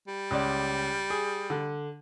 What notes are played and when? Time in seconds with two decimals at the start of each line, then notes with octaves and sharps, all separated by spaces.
0.08 G3
0.31 C#2 D5
1.10 G#4
1.50 D3